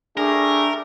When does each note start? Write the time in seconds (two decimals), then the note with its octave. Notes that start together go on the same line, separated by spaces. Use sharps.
0.17 G3 A3 D4 G#4 A#4